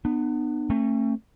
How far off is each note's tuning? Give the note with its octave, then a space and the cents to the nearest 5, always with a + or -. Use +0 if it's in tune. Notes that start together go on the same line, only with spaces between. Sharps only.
B3 +0 D4 +45
A3 +25 C#4 -45